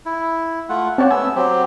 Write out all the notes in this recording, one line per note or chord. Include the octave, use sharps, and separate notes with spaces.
E4
A3 F4 F#5
C4 G4 C#5 F#5 A5
A3 B3 G#5 E6
F#3 C4 G4